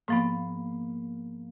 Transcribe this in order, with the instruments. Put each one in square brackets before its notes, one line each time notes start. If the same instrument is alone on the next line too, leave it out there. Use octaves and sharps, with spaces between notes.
[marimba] G#2 F3 B3 [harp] A#3